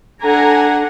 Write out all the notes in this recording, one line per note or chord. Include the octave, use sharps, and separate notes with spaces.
D4 A4 F#5 G#5 A#5